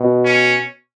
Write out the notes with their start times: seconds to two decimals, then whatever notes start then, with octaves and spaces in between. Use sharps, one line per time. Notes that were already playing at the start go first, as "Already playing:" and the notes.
Already playing: B2
0.25 C#4